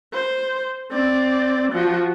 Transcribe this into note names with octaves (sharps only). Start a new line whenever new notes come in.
C5
C4 D5
F3 F#4